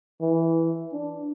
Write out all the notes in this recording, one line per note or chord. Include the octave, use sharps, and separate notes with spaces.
E3
D4